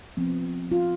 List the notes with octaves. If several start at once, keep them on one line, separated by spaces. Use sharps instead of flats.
F3 B3 C4
F4